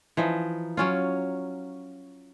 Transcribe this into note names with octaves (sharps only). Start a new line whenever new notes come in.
E3 F3 D#4
F#3 C#4 F4